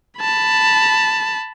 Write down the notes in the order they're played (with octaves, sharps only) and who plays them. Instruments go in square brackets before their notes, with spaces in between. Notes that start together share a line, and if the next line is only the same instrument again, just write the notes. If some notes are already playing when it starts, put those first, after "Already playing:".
[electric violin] A5 B5